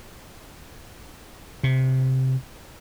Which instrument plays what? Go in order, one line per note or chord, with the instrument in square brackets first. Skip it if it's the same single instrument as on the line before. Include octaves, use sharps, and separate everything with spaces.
[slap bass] C3